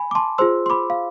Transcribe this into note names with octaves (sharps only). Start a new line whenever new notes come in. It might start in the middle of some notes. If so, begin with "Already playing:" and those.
Already playing: G#5 B5
D6
A5 C6
F4 G#4 C5 C6 E6
C6
B5 D6
F5